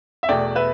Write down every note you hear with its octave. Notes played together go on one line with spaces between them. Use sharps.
E5
E2 B2 A3 D5 G5
B4 E5